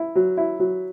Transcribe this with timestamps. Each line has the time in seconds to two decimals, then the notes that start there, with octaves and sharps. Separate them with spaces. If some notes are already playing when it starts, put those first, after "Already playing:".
Already playing: E4
0.15 F#3
0.37 E4
0.59 F#3